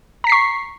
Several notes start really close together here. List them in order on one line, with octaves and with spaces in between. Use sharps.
A#5 B6 C7 C#6